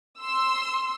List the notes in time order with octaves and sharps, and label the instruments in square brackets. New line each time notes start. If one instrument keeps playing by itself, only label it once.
[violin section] C6 E6